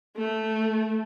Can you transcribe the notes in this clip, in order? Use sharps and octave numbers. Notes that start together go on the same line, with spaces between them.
A3